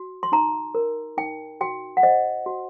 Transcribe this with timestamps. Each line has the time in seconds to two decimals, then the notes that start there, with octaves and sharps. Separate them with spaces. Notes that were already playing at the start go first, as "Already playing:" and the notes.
Already playing: F#4
0.23 C6
0.32 D#4 A#5
0.75 A#4
1.18 D#4 G5
1.61 F#4 G5
1.97 F#5
2.03 C5 D#5
2.46 F#4